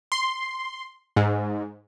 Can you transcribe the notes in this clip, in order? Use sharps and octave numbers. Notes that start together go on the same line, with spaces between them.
C6
G#2